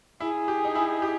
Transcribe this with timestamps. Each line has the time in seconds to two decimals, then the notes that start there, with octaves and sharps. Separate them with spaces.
0.20 E4 G#4
0.48 G4
0.65 D#4
0.75 E4
1.02 G4